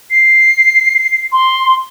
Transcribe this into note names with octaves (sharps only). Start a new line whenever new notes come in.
C7
C6